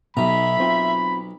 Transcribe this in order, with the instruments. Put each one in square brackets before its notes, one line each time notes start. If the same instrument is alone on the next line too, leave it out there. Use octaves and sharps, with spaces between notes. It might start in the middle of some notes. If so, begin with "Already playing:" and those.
[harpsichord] B1 A#5 [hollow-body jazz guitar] B2 D#4 [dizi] E5 [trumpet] B5
[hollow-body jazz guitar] C4 F4